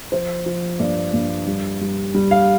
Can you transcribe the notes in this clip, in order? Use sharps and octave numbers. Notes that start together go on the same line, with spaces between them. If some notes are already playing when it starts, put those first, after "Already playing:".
F3 C5
F3
G2 D5
G2
G3
G3
G3
F5